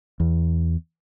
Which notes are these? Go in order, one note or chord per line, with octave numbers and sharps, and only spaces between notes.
E2